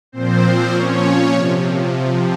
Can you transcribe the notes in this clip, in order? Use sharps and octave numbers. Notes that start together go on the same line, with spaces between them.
A#2 F3 C4 C5
A#2 F3 C#4 C#5
C3 F3